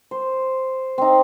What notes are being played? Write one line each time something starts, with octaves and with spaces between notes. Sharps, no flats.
C5
C4 D#4